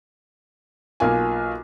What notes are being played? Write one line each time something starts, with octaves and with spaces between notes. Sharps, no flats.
B1 A#3 F4 G#5